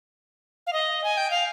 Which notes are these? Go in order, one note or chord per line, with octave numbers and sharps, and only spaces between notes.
F5
D#5
G#5
G5
F5